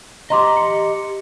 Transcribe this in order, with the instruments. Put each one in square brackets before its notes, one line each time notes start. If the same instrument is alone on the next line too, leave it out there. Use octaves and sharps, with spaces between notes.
[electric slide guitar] G4 D#5 [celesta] A#5 C6 D6
[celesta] C#7